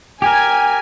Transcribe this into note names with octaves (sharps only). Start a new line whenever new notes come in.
G4 A#4 G#5